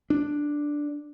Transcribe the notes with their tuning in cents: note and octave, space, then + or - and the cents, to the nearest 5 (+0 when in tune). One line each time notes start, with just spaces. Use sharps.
D4 +0